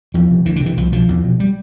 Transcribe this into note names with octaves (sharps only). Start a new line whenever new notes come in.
E2 F3
C3
D2 E3
D3
C3
E3
C2 F3
B2 F3
E2
B2
G3